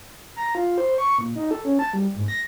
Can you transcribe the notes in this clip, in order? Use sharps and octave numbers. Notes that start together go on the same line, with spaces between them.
A#5
F4
C5
C#6
A#2
D#4
A4
C#4
A5
G3
G#2
A#6